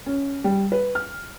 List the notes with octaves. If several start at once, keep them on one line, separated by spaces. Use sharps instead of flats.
C#4
G3
B4
F6